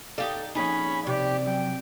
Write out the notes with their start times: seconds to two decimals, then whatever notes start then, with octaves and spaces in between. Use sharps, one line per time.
0.18 D#4 G4 A4 D5 F5
0.55 F2 A#2 C#4 D#4 G#4 B5
1.07 C3 G4 D5
1.46 F#2 G5